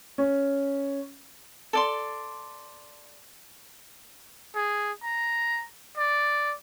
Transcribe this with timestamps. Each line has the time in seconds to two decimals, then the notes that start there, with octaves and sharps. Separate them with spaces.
0.18 C#4
1.73 A4 D5 C6
4.55 G#4
5.03 A#5
5.97 D5